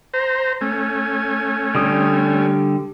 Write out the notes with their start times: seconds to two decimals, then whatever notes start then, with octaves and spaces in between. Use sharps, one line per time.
0.14 C5 A#5
0.61 A3 C#4 G#5
1.75 D3 G3 D#6